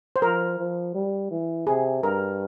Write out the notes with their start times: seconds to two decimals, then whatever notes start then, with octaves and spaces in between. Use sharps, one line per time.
0.16 C5
0.22 F3 A#4
0.58 F3
0.94 G3
1.31 E3
1.67 C3 G#4
2.03 G2 A#4